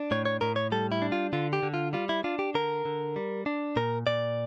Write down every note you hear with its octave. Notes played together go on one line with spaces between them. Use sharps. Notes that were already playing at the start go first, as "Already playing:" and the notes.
Already playing: D4
A2 C#5
C#5
A2 A#4
C#5
G3 A4
E4
D4
F4
D3 F4
G4
D3
F4
G3 F4
E4
D4 F4
G4
D3 A#4
D3
G3
D4
A#2 A#4
A#2 D5